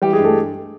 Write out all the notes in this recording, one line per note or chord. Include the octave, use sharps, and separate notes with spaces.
E3 G3 G4
G#3 G#4
G2
A3 A4